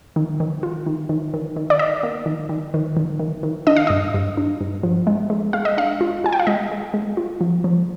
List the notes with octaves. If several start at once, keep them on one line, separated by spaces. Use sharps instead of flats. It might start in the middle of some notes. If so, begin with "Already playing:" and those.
D#3
D#3
F4
D#3
D#3
D#3
D#3
D5
D#4 D#5
A#3
D#3
D#3
D#3
D#3
D#3
D#3
D4 D#5
F5
G2 D#5
G2
D4
G2
F3
G#3
G#3
G#3 F5
D#5
D4 F5
F4
F4 G#5
G5
F5
G#3 D#5
G#3
G#3
F4
F3
F3